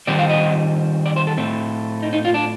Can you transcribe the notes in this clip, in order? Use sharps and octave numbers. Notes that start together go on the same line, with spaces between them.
D#3 G3 C4 D5
F5
D#5
D5
C5
A4
A2 A3 C4
D#4
D#4
F4
D4